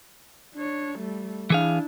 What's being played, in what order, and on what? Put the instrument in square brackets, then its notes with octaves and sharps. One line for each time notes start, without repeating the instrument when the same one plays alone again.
[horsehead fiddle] D4 C#5
G3 A3
[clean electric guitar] E3 G#4 F5 [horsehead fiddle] D4 E4